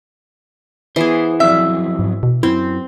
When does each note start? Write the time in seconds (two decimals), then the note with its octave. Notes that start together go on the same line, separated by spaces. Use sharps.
0.96 E3 B3 G#4 C5
1.40 F3 F#3 C4 E5
1.99 G#2
2.23 B2
2.43 F#2 C4 E4